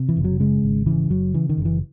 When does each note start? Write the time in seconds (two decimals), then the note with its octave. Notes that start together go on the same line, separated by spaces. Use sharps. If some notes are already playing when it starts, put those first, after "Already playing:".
Already playing: C3
0.09 E3
0.17 F#1
0.24 F#3
0.40 C#3 G#3
0.63 G#1
0.86 C#3 E3
1.10 F#1 F#3
1.34 C#3 E3
1.49 D#3
1.57 F#1
1.65 E3